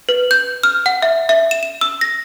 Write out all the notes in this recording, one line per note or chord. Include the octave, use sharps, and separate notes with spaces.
B4
G6
F6
F#5
E5
E5
E7
E7
E6
A#6